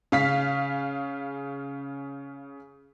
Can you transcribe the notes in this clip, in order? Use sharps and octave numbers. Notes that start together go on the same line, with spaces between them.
C#3 F5 B6